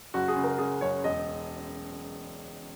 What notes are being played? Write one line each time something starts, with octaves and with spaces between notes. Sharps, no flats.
F#1 F#4
G#4
C#3
A#4
C#3 G#4
F#1 C#5
E1 D#5